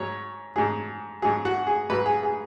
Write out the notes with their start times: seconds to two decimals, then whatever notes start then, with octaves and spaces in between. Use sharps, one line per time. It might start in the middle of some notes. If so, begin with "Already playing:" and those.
Already playing: G#2 F#3 C#5
0.56 G#2 F#3 G#4
1.22 G#2 F#3 G#4
1.45 F#4
1.67 G#4
1.89 G#2 F#3 B4
2.06 G#4
2.23 G#4